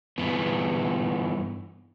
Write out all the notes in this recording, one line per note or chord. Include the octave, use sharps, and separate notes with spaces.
G2 E3 B3